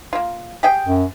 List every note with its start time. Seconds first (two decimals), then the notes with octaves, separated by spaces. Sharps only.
0.13 A#3 F4
0.63 G4 G#4 G5
0.88 F#2